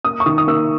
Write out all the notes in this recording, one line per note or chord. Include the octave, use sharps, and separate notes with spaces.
A#3 D#6
C#6
D#3 D#6
D#6
A#3 E6